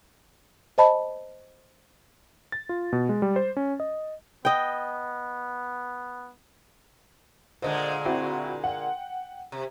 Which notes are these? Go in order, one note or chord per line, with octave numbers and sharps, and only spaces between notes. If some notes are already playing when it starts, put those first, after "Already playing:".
C5 D#5 A5 B5
A6
F4
B2
G#3
G3
C5
C#4
D#5
B3 D#5 G5
A#2 D3 G#3 C5 D#5
C4 E4 F#4
F#5 G5
C3